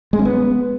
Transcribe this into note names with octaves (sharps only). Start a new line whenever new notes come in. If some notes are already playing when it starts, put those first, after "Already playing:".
G#3
C#4
B3